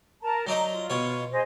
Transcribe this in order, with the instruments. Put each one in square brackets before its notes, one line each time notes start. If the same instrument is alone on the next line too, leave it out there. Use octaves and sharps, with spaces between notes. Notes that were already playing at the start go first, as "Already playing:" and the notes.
[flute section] A#4 A5 A#5
[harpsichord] F#3 D5 D#5 [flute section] D#4 A#5
[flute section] F4
[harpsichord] B2 C#5
[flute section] G#4 C5 D#5